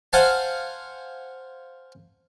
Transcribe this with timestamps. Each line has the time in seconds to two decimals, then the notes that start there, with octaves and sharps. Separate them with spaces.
0.13 C5 F5 F#5 G#5 A5